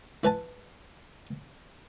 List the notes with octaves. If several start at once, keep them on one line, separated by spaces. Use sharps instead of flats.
E4 B4 G#5 A5